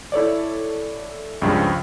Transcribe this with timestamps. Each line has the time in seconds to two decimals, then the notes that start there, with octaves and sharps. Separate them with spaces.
0.12 E4 A4 C#5 D5
1.42 C#2 G2 C#3 F3